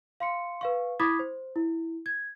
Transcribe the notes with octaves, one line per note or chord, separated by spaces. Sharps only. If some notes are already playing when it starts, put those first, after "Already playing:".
F5 C6 C#7
B4 F5 C#6
E4 B5 D6 D#6 G#6 B6
C5
E4
G#6